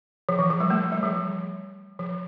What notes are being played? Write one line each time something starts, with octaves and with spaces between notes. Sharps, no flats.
F3
E3
F3
G3
A3
G3
F3
F3